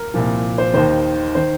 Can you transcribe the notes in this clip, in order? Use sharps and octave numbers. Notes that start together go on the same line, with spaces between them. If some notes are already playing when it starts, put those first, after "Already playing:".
Already playing: A#4
C2 A#2 F3
C5
D#2 D#3 C5
D#3 C5